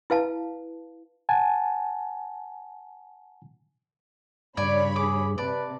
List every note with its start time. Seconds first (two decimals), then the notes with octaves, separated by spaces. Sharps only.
0.10 E4 B4 F5 A5
1.29 F#5 G#5 A5
4.57 G2 C#3 C#5 D5 G#5 B5
4.96 G#4 D6
5.38 C3 B4 D5 A5